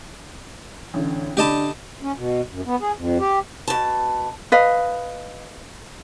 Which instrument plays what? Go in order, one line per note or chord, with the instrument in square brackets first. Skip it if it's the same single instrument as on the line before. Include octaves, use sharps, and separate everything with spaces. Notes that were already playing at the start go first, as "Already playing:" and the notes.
[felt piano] A1 D3
[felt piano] D3 B5 [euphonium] D4 [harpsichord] G4 D#5 A5
[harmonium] C#4
B2
F#2
B3
G#4
F2
G4
[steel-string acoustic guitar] B2 A5
[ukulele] B4 D#5 F5